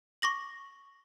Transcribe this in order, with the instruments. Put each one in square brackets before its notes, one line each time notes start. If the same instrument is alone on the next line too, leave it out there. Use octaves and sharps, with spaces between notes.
[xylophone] C#6 D6 A#6 F#7